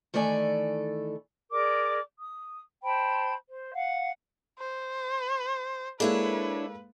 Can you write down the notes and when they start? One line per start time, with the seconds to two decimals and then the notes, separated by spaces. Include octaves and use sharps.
0.14 D#3 E3 A3 A4 D5 G#5
1.51 G#4 A#4 D5 D6
2.18 D#6
2.83 C5 G5 A5 B5
3.48 C5
3.74 F5 F#5
4.59 C5
6.00 G#3 A#3 D4 E4 A4 B4 C#5